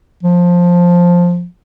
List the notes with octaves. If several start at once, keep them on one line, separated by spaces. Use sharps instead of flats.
F3